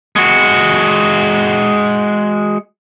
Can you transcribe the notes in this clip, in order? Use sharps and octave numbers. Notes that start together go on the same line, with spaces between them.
G#3 F#4